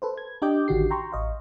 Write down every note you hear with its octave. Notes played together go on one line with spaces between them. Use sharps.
A4 B4 C5
G#6
D4 G4 D#5 G5 D6 G6
A1 D3 D#3 F#4 G4 C7
G5 A#5 C6 C#6
A1 D#5 F5